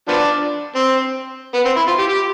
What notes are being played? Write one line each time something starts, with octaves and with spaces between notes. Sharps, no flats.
F3 B3 D4
C4
B3
C4
E4
F4
G4
G4